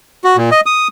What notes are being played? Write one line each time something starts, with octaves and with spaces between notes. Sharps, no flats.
F#4
A#2
D#5
D#6